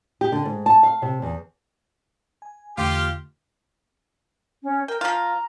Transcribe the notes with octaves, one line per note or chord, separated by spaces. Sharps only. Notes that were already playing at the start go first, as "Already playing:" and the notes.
G4
D3
G#2
A5
F5
C3
E2
G#5
E2 D3 A3 F4 G4
C#4
A#4 G5
F3 F4 A#5